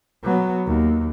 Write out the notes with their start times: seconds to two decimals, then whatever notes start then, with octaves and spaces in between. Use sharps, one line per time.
0.24 F#3 B3
0.67 D#2